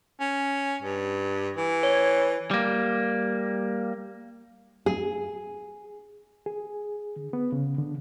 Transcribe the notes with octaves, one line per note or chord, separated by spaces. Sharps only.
C#4
G2
E3
C#5
G3 A#3
G#4
G#4
D3
B3
C#3
D3